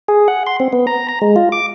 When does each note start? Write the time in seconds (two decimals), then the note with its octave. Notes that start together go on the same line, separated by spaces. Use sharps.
0.08 G#4
0.28 F#5
0.47 C6
0.60 C4
0.73 B3
0.87 A#5
1.08 A#5
1.22 G#3
1.36 F4
1.52 D6